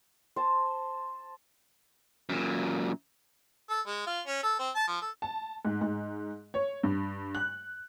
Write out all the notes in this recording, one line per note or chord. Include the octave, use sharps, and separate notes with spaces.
C5 A5
F#2 A#2
A4
G#3
F4
C#4
A4
C4
A5
F3
A4
A5
G#2
G#2
C#5
G2
F#6